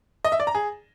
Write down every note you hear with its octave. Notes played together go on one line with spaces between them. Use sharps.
D#5
E5
D5
A#5
G#4